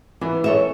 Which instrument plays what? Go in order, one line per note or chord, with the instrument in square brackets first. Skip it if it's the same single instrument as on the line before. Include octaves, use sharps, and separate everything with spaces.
[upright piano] E3 [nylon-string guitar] B3
[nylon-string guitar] A4 C#5 E5